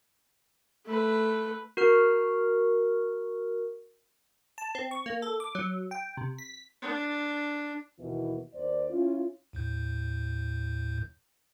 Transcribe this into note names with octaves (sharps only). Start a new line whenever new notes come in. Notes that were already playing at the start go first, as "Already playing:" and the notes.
A3 B4
F#4 A#4 F6
A5
C4
C#6
A#3
A4
D6
F#3
G5
C3
B6
D4
D#2 B2 E3
D#2 C5 D5
C#4 E4 F4
D#2 A2 G6